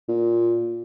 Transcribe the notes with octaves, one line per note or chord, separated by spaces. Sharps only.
A#2